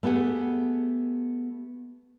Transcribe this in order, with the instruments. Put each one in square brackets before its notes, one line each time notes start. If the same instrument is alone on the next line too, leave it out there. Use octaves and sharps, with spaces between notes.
[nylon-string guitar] A3 B3 G4 G#4 F#5